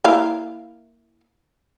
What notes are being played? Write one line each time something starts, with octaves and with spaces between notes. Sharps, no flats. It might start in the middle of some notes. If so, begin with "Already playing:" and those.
A#3 E4 F5